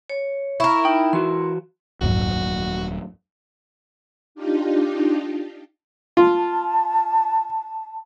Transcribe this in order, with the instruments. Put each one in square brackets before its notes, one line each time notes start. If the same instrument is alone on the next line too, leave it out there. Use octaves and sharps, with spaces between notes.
[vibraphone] C#5
[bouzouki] E4 A#4 [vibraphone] C#6
[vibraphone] D#4 [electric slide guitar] G5
[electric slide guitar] E3 F#4 [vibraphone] C6
[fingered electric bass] D#1 F#3 [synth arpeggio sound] C2 F2 G#2 [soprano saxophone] F#4
[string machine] D4 D#4 F4 G4
[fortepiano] F4 [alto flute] A5